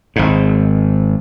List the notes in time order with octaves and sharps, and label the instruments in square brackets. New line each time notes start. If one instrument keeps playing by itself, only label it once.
[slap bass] G#1 G#2